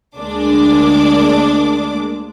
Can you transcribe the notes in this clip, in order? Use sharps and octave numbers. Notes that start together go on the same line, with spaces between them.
D2 G#3 A#3 D4 D6